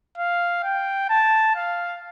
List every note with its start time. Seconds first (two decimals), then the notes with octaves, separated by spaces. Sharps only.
0.18 F5
0.64 G5
1.10 A5
1.56 F5